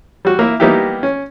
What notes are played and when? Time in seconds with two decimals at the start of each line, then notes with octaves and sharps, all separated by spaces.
0.25 G3 F#4
0.39 A#3 E4 E5
0.60 G3 A#3 B3 D#4 E4 G4
1.03 C#4